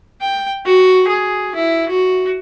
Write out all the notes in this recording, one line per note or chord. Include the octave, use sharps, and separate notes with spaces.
G5
F#4
G#4
E4
F#4